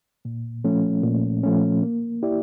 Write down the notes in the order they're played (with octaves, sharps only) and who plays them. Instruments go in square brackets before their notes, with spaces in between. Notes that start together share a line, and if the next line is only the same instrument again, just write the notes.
[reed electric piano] A#2
F3 A3 C#4
A#2
F3 A3 C#4
A#3
E4 G4 D5